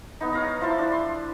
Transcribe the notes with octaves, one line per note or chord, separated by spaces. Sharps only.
B3 D#4
C#5 F5 A#5
F3 E4 C5 A5
D4
C6